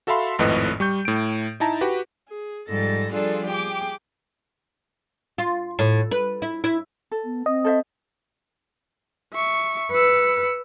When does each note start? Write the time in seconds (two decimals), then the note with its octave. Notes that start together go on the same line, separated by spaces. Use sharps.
0.07 F#4 A4 E5 F5 B5 C6
0.39 G#1 F2 A2 B4 D#5
0.80 G3 C#6 G6
1.05 A2 D7
1.60 D#4 E4 A5 A#5
1.81 F#4 G4 B4
2.29 G#4
2.67 G#2 F3 G3 A4 A6 A#6
3.12 F3 G3 D4 F4 G#4 A4
3.46 G4 G#4 G5 D6
5.38 F4
5.79 A2
6.11 B4
6.42 E4
6.64 E4
7.11 A4
7.24 B3
7.46 C4 D#5
7.64 A4 C5 E5
9.33 E5 C#6
9.92 B4 E6 C#7